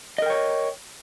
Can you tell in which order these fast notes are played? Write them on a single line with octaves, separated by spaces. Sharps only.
D#5 A#4 G5 C#5